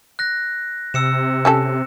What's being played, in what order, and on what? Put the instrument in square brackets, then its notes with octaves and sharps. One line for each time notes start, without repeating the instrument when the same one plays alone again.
[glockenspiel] F#6 A#6
[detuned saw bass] C3 [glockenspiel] E6 C#7 E7
[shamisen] C#4 G4 A4